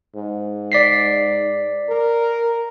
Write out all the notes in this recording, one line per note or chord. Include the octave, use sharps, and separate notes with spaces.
G#2
D5 B6 C7
A#4